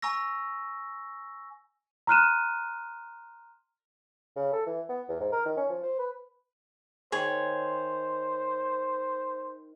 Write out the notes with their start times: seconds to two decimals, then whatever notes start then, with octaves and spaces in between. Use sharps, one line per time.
0.02 G#5 A#5 C#6 E6 A#6
2.07 A#5 C6 F6 F#6 D#7 E7
4.36 C#3
4.53 A4
4.66 E3
4.89 B3
5.09 E2
5.20 G#2
5.32 A#4
5.46 D#3
5.57 C#4
5.70 F3
5.83 C5
5.99 B4
7.12 D#3 G#4 C5 C#5